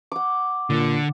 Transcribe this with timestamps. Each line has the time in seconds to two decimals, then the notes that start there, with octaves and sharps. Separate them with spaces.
0.12 F#5 D6
0.70 A#2 D3